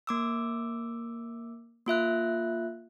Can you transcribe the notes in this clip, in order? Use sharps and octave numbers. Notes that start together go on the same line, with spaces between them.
A#3 D6 E6
A#3 F4 E5 F#6